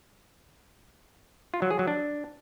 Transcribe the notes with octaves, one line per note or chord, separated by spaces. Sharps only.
F4
F#3
G#4
F#3
D4